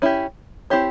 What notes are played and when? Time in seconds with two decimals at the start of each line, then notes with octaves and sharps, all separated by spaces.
0.02 C#4 E4 G4
0.70 C4 E4 G4 C#5